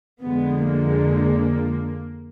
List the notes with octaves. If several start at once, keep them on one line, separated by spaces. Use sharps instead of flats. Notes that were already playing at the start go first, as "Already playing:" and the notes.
F2 D3 F3 G#3 B3
A#3